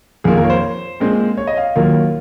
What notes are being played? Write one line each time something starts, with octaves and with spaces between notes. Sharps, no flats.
F2 D#3 A#3 F4 G#4
A#4
C#5
C5
A#2 G#3 C4
C#5
D#5
F5
D#2 D#3 F#3 A#3 F4